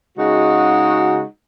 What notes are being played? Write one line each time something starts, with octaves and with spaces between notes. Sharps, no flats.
C#3 G#3 D#4 F#4